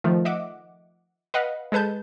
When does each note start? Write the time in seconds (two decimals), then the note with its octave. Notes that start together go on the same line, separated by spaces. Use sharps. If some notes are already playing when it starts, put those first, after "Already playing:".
0.04 D#3 F3 A3
0.25 D#5 E5 F#5 D6
1.34 B4 D#5 F5 F#5
1.72 G#3 A4 B4 A5 G6